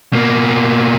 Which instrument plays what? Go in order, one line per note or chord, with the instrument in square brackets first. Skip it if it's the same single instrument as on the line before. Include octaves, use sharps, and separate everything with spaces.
[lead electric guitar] B2 A#3